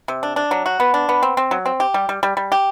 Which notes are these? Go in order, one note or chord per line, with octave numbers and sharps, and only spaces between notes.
C3
D4
D4
F#3
F#4
B3
D4
B3
C4
C4
F#3
C4
G4
G3
G3
G3
G3
G4